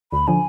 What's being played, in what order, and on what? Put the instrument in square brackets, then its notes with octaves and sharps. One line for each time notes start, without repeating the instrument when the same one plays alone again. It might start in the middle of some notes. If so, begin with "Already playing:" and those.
[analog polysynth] D2 [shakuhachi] B5
[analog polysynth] D3 F3 [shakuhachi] G#5